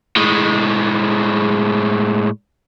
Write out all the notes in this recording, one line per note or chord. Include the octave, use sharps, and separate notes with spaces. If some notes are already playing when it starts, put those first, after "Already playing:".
A2 G#3